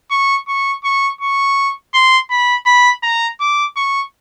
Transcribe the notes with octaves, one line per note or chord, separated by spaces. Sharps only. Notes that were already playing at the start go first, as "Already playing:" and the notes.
C#6
C#6
C#6
C#6
C6
B5
B5
A#5
D6
C#6